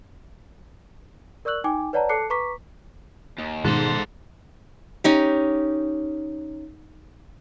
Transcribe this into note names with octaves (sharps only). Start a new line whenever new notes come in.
A#4 D5 C#6 E6 F#6 F#7
D#4 G5 G#5 D6
B4 C#5 D5 F#5 A5 A#5
A4 A5 D6 F#6 C7 C#7
B4 A#5 C#6 D6 B6
D#2
G#2 B2 D#3 A4 C5
C#4 D#4 G4